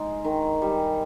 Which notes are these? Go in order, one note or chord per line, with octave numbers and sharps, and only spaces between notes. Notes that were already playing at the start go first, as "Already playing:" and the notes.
Already playing: G#3 D#4 D#5
D#3
G3